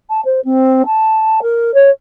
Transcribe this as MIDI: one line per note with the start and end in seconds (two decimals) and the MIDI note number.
0.09 0.20 81
0.24 0.40 72
0.44 0.82 60
0.86 1.40 81
1.42 1.74 70
1.74 1.89 73